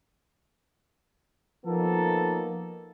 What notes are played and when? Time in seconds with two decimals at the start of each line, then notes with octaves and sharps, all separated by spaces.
1.65 F3 A#3 B3 D#4 A4